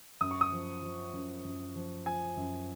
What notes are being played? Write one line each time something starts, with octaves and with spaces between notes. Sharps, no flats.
F#2 D#6
C#6
D#6
F3
F3
F#2
F#2
F3
F3 G#5
F#2